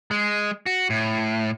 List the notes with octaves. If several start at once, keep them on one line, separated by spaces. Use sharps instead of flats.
G#3
F#4
A2